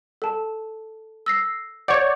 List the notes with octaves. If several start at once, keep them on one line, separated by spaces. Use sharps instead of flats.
A4 A5
E6 A#6 C7
C#5 D5 F#5 G6